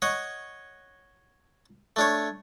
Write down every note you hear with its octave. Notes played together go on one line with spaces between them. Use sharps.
C#5 D#5 F#5
A3 D4 C#5